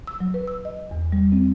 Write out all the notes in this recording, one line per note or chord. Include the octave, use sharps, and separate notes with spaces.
E6
F#3
B4
E6
D#5
E2
G3
C4